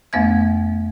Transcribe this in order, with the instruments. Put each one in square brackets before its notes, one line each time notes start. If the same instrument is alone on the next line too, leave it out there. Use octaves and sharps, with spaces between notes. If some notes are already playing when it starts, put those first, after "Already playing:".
[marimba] F2 A3 B3 E5 G#6